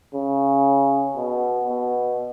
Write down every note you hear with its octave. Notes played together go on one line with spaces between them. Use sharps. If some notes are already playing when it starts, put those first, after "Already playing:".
C#3
B2
B2